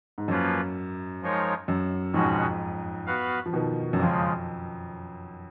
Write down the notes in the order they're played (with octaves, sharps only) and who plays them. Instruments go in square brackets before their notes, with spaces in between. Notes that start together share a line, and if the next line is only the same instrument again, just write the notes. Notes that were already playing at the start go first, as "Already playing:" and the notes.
[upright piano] G#2
[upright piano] F#2 [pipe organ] F3 A#3 C#4 F4 B4
[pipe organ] F3 G#3 D#4 A#4 C#5
[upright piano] F#2
[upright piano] F2 G#2 [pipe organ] B2 G#3 C#4 F#4
[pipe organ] B3 F#4 B4 F5
[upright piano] F3
B2 D#3
F#2
[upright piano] F2 [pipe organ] C#3 F3 G#3